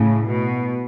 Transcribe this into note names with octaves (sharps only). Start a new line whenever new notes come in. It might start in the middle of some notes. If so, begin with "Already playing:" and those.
Already playing: A2 C#3
B2